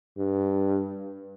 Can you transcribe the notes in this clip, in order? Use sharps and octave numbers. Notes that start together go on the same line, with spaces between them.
G2